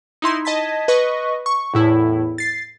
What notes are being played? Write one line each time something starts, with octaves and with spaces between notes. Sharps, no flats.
D#4 E4 C6
D#5 A5 G#6 B6
B4 D#5 C#6
C#6
E2 A2 E4
A6 C7